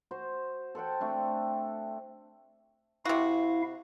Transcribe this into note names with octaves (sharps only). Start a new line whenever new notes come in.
F#4 C5
A4 C5 F#5 G5
A3 C4 D4
C3 E4 F#4 F5